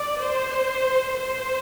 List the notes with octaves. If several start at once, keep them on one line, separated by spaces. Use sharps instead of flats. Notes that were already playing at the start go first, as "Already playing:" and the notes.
Already playing: D5
C5
C5